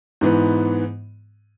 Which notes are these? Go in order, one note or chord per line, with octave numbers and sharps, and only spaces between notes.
G#2 E3 B3